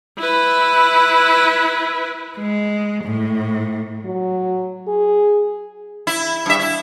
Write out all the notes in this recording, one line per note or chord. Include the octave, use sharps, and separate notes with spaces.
E4 B4
G#3
A2
F#3
G#4
E4
G2 E5
E4